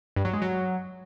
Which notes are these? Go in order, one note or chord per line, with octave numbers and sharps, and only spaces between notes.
G2
F#3
G#3
F#3